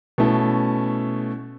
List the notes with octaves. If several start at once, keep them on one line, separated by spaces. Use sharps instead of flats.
B2 A3 C#4 E4